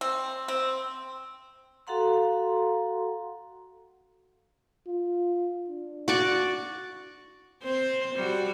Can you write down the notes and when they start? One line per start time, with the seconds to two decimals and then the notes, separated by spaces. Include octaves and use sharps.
0.01 C4
0.48 C4
1.87 F#4 A4 F5 F#5 A#5 C6
4.86 F4
5.68 D4
6.08 F#4 D5 C#6
7.63 C4 C5
8.15 G3 F#4